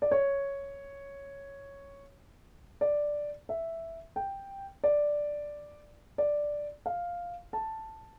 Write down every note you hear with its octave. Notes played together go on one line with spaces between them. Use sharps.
D5
C#5
D5
E5
G5
D5
D5
F5
A5